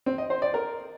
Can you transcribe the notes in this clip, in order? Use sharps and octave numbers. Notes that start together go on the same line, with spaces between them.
C4
D#5
C5
D5
A#4